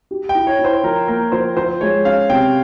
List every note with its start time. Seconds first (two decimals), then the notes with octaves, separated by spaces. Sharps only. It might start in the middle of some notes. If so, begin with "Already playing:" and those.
0.11 G4
0.29 G5
0.35 E4
0.47 C#5
0.59 E4
0.65 C5
0.83 F3 A#4
1.07 A#3 A#4
1.32 F3 C5
1.57 F3 C5
1.81 G#3 C#5
2.05 C#4 F5
2.30 C3 G5